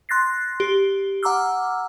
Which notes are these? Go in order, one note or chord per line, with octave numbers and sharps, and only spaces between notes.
C6 F#6 A6 A#6 C7
G4
F#5 A#5 D6 E6 F6